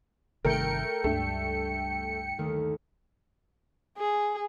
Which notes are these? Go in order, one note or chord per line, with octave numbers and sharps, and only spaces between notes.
G1 C3 D#3 A3 A#4 G5 C#7
C#2 G2 A3 D4
D#2 D#3 A3
G#4